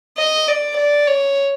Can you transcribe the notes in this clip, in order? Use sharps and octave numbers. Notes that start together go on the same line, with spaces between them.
D#5
D5
D5
C#5